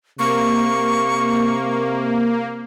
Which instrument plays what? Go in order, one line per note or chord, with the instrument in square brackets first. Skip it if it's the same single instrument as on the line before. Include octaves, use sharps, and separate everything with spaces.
[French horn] C3 [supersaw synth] A#3 [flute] C#6